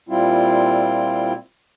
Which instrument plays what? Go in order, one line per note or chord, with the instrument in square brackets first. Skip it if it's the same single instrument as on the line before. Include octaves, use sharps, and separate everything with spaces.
[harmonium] A#2 G3 C4 E4 F4